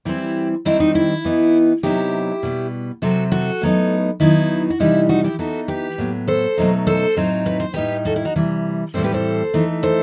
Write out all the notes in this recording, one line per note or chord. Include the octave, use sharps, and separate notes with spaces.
E3 G3 C4 E4 G4
D#3 G3 C4 D#4 E4
D#4
E4
E3 B3 D#4
C3 F#3 B3 D#4 E4 G4
B2 G3 B3
C3 F#3 C4 F#4 A4
F#4 A4
A2 F#3 B3 D#4
D#3 F#3 B3 D#4 E4
F#4
C3 E3 G3 D#4 E4
D#4 F#4
E4 G4
E3 B3 D#4 F#4 A4
G4 B4
A2 F#3 B3
A4 C5
B2 F#3 A3 D#4
A4 C5
A2 F#3 C4 D#4
B4
C5
A2 G3 D#4 G4 B4
F#4 A4
E4
D#4 F#4
C3 E3 G3
A2 E3 G3 C4 A4 C5
G4 B4
A4 C5
E3 A3 D#4
A4 C5